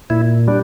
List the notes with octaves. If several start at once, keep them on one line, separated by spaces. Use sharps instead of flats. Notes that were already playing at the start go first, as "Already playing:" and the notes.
A#2 E4
G3 D4